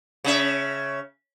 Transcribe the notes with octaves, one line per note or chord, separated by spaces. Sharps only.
C#3 C#4 E5